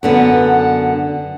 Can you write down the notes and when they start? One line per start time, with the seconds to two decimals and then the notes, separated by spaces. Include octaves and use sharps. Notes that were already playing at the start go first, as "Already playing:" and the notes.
0.03 F#2 D3 B3 F#5